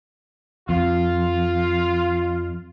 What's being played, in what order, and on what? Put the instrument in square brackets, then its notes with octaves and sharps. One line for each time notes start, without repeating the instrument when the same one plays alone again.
[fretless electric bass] F2 [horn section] F4